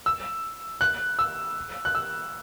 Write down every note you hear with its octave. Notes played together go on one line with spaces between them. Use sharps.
E6
F#6
E6
F#6
E6